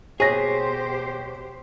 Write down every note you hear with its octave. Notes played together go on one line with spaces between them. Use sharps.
B2 G4 G#4 C5 C#5 A#6